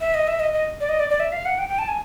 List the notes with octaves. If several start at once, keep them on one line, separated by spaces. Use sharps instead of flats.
E5
D#5
E5
D#5
D#5
D5
D#5
D5
D5
E5
F5
F#5
G5
G5
A5
G#5